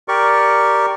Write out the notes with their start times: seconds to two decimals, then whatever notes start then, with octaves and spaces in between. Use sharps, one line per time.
0.08 G4 A#4 D5 C#6